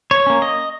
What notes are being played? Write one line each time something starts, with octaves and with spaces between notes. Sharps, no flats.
C#5
A#3 C#4
D#5